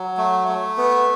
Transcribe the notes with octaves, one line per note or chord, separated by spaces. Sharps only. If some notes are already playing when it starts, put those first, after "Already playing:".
Already playing: F#3
A3
A3
B3